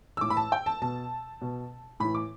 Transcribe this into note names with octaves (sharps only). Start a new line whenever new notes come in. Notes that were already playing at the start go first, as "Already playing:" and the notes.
E6
A2 E3 D6
B5
A5
G5
A5
B2 A5
B2
A2 E3 B5
D6